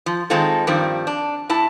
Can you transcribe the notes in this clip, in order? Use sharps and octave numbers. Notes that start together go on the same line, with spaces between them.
F3
D#3 G#3 C4 D#4 F4 A4
G2 D#3 F3 G3 C4
D4
A2 E4 A5